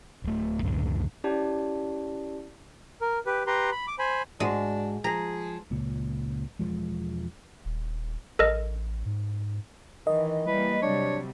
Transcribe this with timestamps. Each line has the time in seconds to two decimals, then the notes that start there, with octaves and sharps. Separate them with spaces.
0.24 D1 A3
0.63 C#2 F#2 A2 D3
1.24 C#4 E4 G4 D5 A5
3.01 A#4
3.26 G4 B4
3.47 G4 B4 A#5 C6
3.72 B5
3.87 D6
3.99 C5 G#5 B5
4.40 G#2 G#3 D4 F#4
5.04 F3 G#4 A#5
5.71 C#2 A#2
6.59 E1 C#2 F3 G#3
7.65 D#1
8.39 A1 A4 A#4 D#5
9.05 G#2
10.07 D#3 E3 D#5
10.47 E3 G3 A#3 B4
10.82 C3 F#3 G3 D4 C#5